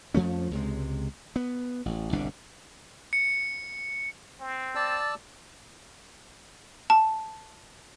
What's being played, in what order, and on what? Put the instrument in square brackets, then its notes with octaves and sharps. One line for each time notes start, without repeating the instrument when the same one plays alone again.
[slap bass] F2 F3 A3 C#4
C#2 C3 G#3
B3
A1
G1 C2 B2 D4
[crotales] C#7
[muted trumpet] C4
[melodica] D5 A5 E6
[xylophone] A5